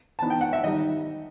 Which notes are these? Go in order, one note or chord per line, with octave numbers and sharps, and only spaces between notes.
E3 B3 D#4 A5
G5
F#5
E5
D#3 G3 D#4 D#5